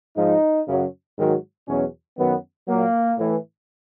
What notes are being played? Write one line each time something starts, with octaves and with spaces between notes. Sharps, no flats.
G#2 F3 D#4
F#2 C#3 F#3
G#2 D#3 F#3
E2 B2 F#3 C#4
F#2 D#3 F#3 B3
A#2 F#3 A#3
A2 E3